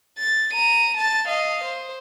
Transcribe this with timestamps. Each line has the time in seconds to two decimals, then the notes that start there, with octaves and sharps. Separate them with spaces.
0.19 A6
0.54 A#5 D#7
0.97 A5 A6
1.28 D#5 F5
1.64 C5